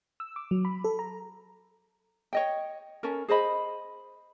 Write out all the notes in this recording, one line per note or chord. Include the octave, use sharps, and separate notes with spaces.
E6
D6
F#3
B5
A4
A#5
C#5 D#5 G5
C#4 A4 A#4
G#4 C5 D#5 B5